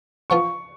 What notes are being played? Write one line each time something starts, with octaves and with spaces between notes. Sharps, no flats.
F3 B3 F4 C#6